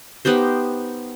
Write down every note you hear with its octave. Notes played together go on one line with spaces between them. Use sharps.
B3 D#4 G4 C5